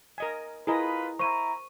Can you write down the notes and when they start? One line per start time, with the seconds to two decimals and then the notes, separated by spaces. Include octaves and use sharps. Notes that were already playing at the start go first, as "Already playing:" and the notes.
0.18 A#4 D#5 G#5
0.67 E4 F4 G#4 A#4 B4 D#5 A#5
1.19 E4 C5 A#5 C#6 D#7